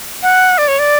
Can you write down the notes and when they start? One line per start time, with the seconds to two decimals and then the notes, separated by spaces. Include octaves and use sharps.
0.23 F#5
0.58 D5
0.68 C#5
0.79 D5